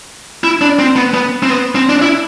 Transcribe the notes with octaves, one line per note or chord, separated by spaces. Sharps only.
E4
D4
C4
B3
B3
C4
B3
C4
D4
E4